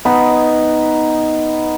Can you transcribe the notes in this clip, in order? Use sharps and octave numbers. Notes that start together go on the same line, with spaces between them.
B3 D#4 B4